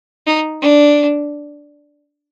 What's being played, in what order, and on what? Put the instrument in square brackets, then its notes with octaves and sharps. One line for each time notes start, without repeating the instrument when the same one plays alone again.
[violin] D#4
D4